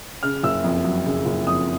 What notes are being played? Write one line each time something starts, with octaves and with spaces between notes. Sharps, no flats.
C#3 F6
F#1 E6
F2
F#3
C#3
F#1
F2 D#6